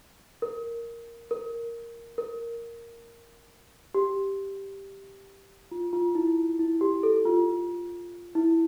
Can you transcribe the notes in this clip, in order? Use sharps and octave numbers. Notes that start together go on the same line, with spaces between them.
A#4
A#4
A#4
G4
F4
F4
E4
E4
G4
A4
F4
E4